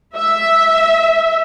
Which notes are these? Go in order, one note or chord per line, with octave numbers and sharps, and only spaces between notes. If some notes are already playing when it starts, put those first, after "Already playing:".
E5